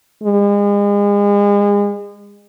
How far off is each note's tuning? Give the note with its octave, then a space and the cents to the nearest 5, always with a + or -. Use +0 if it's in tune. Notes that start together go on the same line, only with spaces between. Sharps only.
G#3 -35